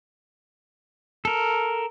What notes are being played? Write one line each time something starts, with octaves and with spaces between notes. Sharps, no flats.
A4 A#4